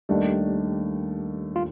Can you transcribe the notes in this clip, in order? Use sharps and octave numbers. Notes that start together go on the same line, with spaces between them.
D#2 D#3 G3 A3 D4
F4